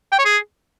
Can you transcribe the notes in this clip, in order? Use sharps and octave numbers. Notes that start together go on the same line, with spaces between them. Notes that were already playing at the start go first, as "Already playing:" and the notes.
G5
C#5
G#4